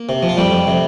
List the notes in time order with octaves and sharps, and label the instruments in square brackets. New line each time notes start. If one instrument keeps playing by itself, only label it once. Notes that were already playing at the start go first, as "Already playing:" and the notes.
Already playing: [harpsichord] A#3
C3
F3
F4
F2 G3 G4
F2
C3